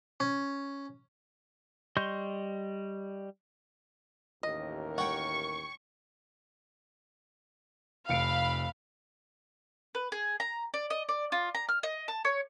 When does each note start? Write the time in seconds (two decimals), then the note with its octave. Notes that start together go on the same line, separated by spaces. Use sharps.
0.20 C#4
1.97 G3 D#5 C6 C#6 G6
4.43 A1 D#2 A#4 D#5
4.98 C#5 F#5 G5 C#6
8.09 F1 F5 B5 C#7 D7
9.95 B4
10.12 G#4
10.40 A#5
10.74 D5
10.90 D#5
11.09 D5
11.32 F4
11.55 A#5
11.69 F6
11.83 D#5
12.08 A5
12.25 C#5